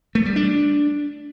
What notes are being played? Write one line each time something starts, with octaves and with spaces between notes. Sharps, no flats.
A3
G3
D4